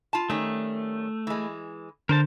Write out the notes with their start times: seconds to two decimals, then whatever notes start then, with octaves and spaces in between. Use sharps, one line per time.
0.13 F4 A5
0.30 D#3 G3 A3 C#4
1.27 E3 G#3
2.09 D3 A#4 C5 A5